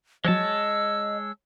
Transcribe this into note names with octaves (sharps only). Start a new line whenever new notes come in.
F3 F#3 G#3 C#5 D#5 A5 E6